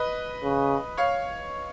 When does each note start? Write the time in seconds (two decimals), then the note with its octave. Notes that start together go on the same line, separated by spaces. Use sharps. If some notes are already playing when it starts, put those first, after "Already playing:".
Already playing: B4 D#5
0.43 C#3
0.97 C#5 F5